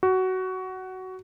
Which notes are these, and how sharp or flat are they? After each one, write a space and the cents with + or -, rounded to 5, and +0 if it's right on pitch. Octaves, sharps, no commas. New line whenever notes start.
F#4 +15